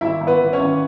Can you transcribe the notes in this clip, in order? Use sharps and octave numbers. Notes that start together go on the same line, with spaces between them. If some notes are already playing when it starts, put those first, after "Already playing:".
G#1 E4 E5
G#1
B3 B4
E3
C#4 C#5
G#1